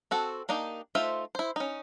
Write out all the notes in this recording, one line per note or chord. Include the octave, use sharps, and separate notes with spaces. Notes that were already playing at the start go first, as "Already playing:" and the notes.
C4 F#4 A4
A#3 D4 D#4 G4
A3 D#4 F4 C5 E5
E4 C5
C#4 D#4